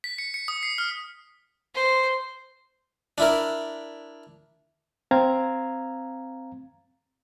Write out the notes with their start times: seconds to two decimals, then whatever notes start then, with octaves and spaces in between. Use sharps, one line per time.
0.04 B6
0.18 C#7
0.34 C#7
0.48 D#6
0.63 C7
0.78 F6
1.75 C5
3.18 D4 E4 A#4
5.11 C4 F5 A#5 G#6